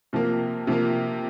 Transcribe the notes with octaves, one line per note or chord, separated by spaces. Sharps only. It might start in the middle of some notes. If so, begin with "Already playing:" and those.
C3 F3 A#3
C3 F3 A#3